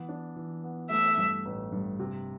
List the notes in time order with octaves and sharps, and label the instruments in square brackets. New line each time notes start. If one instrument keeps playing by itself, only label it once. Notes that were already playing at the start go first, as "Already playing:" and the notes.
Already playing: [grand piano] E3 B3
D4
E3
B3
[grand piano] A3 [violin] E5
[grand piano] G2
A1
G2
C3